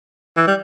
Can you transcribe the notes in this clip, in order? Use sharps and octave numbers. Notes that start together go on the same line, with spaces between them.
E3
G3